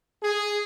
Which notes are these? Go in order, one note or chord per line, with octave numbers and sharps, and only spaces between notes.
G#4